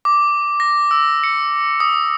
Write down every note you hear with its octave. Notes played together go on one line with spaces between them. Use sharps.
D6
A#6
E6
C#7
D#6